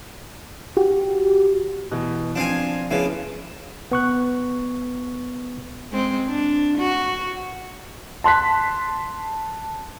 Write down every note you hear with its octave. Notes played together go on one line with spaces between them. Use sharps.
F#4 G4
B2 E3
F3 C4 D4 F5 G#5
C#3 F3 A#3 B3 E4
B3 C#6 F#6
G#3 C4
D4
F#4
A5 C6 F#6 B6